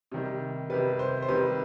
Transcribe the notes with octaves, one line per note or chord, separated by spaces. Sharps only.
C3 D#3 G3
C3 D#3 G3 B4
C5
C5
C3 D#3 G3 B4